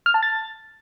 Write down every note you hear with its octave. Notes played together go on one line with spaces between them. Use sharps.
F6
A5
A6